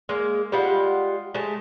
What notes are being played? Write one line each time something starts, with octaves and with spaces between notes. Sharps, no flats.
G#3 A#3
G3 G#3 F4 F#5
G#3 A3 A5